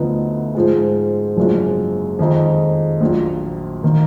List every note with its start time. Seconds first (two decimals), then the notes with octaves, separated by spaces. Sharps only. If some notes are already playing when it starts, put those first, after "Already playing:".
Already playing: D2 D3 F3 B3 D#4
0.55 G#2 F3 G#3
1.36 F#1 F#2 F3 G#3 D4
2.19 F2 D#3 G#3 D#4
3.01 A#1 A#2 F#3
3.83 D#3 A#3